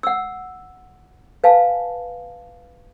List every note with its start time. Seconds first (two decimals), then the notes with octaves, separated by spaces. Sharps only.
0.03 F#5 E6
1.44 B4 F5 G#5 A5